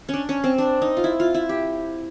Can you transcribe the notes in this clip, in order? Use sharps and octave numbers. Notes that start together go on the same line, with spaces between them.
C#4
D4
C#4
C4
D4
D#4
F4
E4
F4
E4
G4